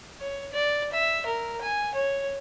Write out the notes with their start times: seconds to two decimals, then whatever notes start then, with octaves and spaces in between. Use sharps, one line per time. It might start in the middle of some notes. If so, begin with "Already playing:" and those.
0.20 C#5
0.53 D5
0.93 E5
1.26 A#4
1.62 G#5
1.95 C#5